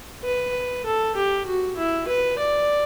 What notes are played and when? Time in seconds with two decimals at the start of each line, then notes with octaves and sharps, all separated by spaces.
0.24 B4
0.86 A4
1.16 G4
1.46 F#4
1.77 E4
2.07 B4
2.38 D5